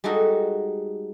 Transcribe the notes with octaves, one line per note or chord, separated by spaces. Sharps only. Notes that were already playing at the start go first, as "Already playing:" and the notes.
G3 G#3 D#4 F#4 A4